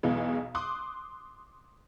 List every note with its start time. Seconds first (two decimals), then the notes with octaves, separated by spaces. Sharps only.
0.03 B1 E2 B2 E3 G#3
0.55 C6 D6 D#6 F#6